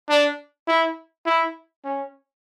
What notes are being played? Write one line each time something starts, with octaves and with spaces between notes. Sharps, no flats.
D4
E4
E4
C#4